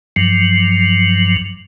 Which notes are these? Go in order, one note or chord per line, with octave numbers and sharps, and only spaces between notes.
G2 F3 F#3